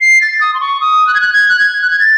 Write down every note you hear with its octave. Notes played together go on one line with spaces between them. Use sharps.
C7
A6
D#6
C6
C#6
D#6
F#6
G#6
F#6
G#6
F#6
G#6
F#6
G#6
A6